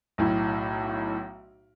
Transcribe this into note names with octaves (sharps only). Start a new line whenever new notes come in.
B1 A2